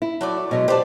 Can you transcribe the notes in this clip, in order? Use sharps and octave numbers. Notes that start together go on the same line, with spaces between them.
E4
F#3 A3 D5
B2 F#3 G#3 C#4
G4 B4 C5 D5 A5